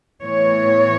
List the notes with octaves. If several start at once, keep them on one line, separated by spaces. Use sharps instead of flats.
A2 E3 B3 C#5